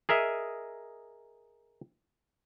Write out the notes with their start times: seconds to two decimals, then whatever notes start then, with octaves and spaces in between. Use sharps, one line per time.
0.09 G#4 A#4 D#5 E5